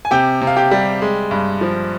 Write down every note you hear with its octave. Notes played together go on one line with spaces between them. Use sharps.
G#5
C3 G4 G5
C3
F5
G4 G5
G3
G#3
G2
F3